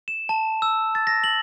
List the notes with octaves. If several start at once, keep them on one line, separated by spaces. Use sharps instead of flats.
E7
A5
E6
A6
A#6
F#7